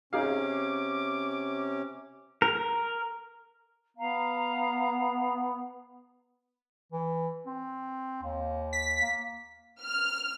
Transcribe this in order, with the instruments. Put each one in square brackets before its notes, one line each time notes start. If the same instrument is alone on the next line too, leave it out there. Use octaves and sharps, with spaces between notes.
[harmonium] C3 C#4 [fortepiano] D#4 G#4 F5 [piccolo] D6
[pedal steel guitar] A#4
[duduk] B3 [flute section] F5 A#5
[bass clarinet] E3
C4
D#2
[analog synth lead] B6
[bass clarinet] A#3
[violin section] F6